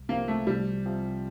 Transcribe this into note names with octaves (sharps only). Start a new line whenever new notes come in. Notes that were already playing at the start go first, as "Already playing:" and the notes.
Already playing: C2
C3 F3 A#3 C4
A3
C2 G3
C3 F3 C4